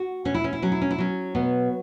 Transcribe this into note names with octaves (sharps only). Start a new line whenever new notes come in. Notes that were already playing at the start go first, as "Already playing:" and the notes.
Already playing: F#4
B2 C#4
E4
C#4
E4
F#3 C#4
E4
C#4
E4
F#3 C#4
B2 B3